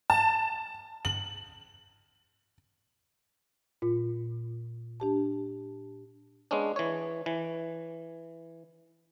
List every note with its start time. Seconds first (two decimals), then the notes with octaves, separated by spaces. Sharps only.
0.10 A5
1.05 F#7
3.82 A#2 F4
5.00 D4 G4 A5
6.51 G#3 B3 C#4 D4
6.76 E3 C#5
7.26 E3